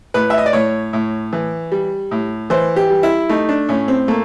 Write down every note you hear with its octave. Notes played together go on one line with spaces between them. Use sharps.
A2 B4
E5
D#5
D5
A2 C#5
A2
E3
G3
A2
E3 C5
G4
G3
E4
A3 D#4
D4
A2 C#4
C4
A3 A#3